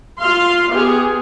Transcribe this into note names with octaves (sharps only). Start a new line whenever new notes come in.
F4 F5 C6
B3 G4 G#4